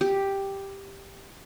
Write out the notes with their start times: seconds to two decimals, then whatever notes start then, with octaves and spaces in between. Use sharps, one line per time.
0.01 G4